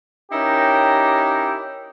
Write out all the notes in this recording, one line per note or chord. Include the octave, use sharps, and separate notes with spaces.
C#4 D#4 E4 G4 A#4